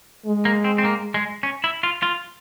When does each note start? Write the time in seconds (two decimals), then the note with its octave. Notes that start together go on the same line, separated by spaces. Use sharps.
0.26 G#3
0.45 A#3
0.64 C4
0.78 C4
0.85 A#3
1.14 G#3
1.43 C#4
1.64 E4
1.83 F4
2.03 F4